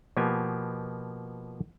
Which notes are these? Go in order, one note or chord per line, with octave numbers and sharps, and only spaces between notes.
B2 F3 A#3 B3 G4 G#5